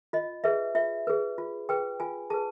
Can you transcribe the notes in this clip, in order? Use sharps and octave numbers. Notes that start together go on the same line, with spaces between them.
F4 D#5
G#4 B4 E5
F4 E5
G#4 B4
F4
G#4 B4 G5
F4 G#5
G#4 B4 A5